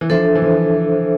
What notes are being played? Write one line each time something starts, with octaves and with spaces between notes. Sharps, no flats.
E3
F3 D4 A4 C5 E5
E3
F3